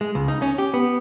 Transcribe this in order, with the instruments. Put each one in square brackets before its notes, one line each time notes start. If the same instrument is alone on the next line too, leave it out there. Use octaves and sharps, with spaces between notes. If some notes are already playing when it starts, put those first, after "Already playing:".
[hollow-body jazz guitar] G#3
C#2
D#4
C#4
G4
B3